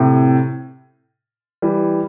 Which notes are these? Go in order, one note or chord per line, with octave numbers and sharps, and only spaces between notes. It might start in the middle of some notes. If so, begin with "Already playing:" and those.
Already playing: A2 C3
E3 G3